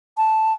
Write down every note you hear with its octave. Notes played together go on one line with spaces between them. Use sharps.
A5